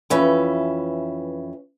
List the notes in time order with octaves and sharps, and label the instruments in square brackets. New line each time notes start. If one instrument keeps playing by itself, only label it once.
[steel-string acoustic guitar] F2 E3 C#4 B4 E5